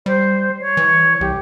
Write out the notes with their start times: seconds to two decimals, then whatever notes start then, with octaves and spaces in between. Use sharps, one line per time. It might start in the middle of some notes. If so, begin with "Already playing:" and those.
0.06 G3 C5
0.60 C#5
0.77 E3
1.21 C2 G4